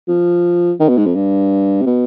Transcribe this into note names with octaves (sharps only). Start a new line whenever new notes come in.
F3
D#3
B2
G#2
F2
G2
C3
B2